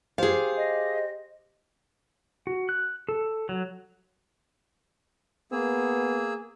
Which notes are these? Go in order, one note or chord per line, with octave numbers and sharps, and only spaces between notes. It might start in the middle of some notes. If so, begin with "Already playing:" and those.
G4 G#4 C5 F5
D#5
F#4
F#6
A4
F#3
A#3 B3 G#4 E6